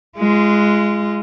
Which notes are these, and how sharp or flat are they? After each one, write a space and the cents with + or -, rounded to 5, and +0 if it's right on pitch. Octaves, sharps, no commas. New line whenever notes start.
G#3 +0 F4 -30